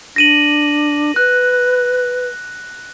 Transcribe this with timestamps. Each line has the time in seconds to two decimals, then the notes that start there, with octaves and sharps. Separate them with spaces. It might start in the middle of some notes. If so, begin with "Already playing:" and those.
0.16 D4 A#6 D#7 F#7
1.16 B4 F#6